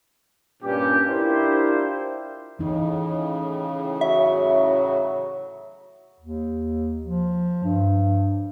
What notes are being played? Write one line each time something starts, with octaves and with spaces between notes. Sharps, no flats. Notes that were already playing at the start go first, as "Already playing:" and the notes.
G2 A#2 C#4 G4
D4 E4 F4 G4 A#4 C5
A2 C#3 E3 D#4
F#3 E5
D#2
F3
G2